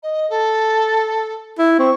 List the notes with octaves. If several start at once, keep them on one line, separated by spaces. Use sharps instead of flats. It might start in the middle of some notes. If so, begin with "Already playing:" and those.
D#5
A4
E4
C4 C#6